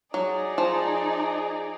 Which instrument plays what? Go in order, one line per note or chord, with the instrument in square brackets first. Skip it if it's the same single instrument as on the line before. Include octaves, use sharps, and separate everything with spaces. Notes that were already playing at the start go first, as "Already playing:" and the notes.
[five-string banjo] F#3 [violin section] D#4 G#4 D5
[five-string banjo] F3